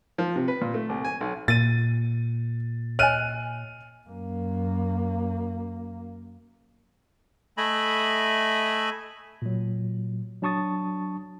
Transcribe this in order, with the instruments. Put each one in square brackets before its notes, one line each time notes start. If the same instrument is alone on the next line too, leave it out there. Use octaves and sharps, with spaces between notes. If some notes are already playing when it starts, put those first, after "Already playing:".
[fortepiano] F3
C3
B4
A#2
A3
C2
G#5
B1
[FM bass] A#2 [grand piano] A6 D#7
[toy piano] C#5 D#5 G#5 [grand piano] F6 F#6 D#7
[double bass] F#2 A#3
[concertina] A3 D#5 E5 G#5 B5
[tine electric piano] A#2 F#3
F#3 D4 A5 C#6 D#6 A6